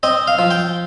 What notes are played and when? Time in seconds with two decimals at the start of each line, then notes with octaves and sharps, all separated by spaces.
0.03 C4 D#5
0.27 F5
0.39 F3
0.51 G5